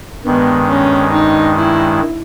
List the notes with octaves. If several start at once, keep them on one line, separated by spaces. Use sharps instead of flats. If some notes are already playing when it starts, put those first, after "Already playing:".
G2 D#3 G#3 B3
C#4
D#4
E4